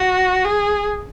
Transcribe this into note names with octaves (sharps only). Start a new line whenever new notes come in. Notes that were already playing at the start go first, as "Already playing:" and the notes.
Already playing: F#4
G#4